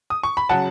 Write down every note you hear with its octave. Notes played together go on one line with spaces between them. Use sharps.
D#6
C#6
B5
C#3 F#3 F#5 A5